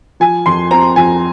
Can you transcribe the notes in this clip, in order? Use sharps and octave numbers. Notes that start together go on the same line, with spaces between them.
F3 G#5
F2 C6
C4 A#5
F2 G#5